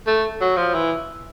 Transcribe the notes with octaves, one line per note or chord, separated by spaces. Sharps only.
A3
F#3
F3
E3